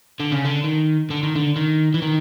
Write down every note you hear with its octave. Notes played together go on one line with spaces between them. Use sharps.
D3
C#3
D3
D#3
D3
D#3
D3
D#3
E3
D#3